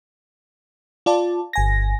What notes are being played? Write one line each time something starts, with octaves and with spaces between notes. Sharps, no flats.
F4 D5 A5
G1 G#5 A#6